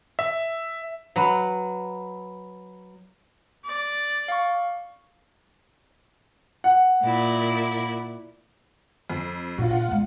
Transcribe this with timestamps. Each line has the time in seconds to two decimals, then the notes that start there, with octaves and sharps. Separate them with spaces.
0.19 E5
1.16 F#3 B4
3.65 D5
4.28 F5 C#6
6.64 F#5
7.03 A#2 E4 D5
9.10 F2
9.58 A#2 F4 F#4
9.71 F4 F#5
9.88 E2 G#3